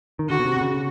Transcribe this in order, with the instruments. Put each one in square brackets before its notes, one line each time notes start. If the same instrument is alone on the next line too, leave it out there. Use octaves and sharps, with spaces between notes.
[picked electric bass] D#3
[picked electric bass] D3 [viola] F#4
[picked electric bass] B2
C3
C3
C#3